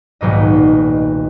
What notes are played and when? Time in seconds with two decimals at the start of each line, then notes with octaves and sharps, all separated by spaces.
0.21 D#1 B1 G#2 D#5